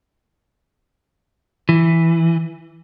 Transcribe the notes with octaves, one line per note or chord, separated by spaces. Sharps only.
E3